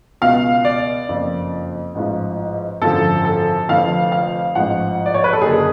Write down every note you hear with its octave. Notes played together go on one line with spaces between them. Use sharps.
C#2 B2 F5
D5
F#1 F2 F3
A1 G#2 F3
G#1 F#2 D3 F3 A4
A4
F1 F2 D3 F3 F5
F5
A1 G#2 F3 F#5
D5
C#5
B4
A4
F#1 F#2 D3 G#4